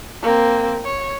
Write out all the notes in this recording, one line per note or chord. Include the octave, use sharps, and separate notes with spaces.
A#3 C4
C#5